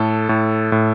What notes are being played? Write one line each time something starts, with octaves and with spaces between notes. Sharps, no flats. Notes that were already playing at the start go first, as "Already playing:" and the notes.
Already playing: A2 A4
A2
A2